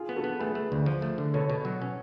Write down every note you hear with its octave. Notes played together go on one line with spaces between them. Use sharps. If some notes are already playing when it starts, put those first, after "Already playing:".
Already playing: F4 G#4
B3
F#4 A4
B3
A3 G#4 B4
A3
D2
F3
A3
D3
B2 A4 C#5
B2
F#3
C#4